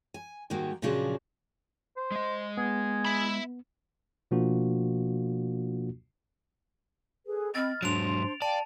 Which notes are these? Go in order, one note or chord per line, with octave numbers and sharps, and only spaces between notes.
G#5
G#2 D#3 G3 A#3 F#4
A#2 C#3 F3 F#3 D4 G#4
C5
G#3 D#5
B3 G#4
E5 B5
B2 F3 A#3 D4 F4 F#4
G#4 A4 B4
C4 D#5 B5 F6 A6
G#2 F#3 D4 C5 C6 D7 F7
D5 F5 G5 A5